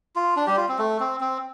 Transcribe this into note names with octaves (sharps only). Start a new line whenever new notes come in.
F4
D4
G3 G4
F4
C4
A3
C4
C4